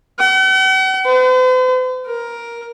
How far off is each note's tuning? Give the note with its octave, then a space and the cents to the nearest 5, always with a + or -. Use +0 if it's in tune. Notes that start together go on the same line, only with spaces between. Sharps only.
F#5 +45
C5 -45
A#4 +10